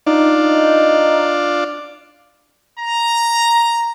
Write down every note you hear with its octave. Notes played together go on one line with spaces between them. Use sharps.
D4 D#4 F4 D5
A#5